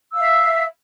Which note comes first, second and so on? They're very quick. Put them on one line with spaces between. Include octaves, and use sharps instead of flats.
E6 F5 E5